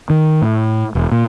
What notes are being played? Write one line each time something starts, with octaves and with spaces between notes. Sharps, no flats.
D#3
A2
E1
A#2